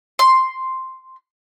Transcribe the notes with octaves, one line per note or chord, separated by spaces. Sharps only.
C6